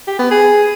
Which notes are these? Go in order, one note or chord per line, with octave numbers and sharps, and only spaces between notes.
G4
B3
G#4